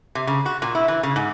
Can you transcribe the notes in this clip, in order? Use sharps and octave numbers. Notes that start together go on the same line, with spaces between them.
C3
C#3
F#4
A#2
E4
E3
C#3
G#2